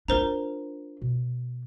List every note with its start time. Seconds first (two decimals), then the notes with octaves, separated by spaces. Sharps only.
0.08 D4 F4 A#4 C5 A#5
1.01 B2